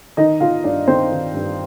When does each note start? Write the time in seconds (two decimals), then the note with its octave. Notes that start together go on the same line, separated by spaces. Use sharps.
0.17 D#3 D#4 D#5
0.40 D#3 F4 F5
0.64 G2 D4 D5
0.88 D#3 C4 C5
1.11 D#3
1.34 G2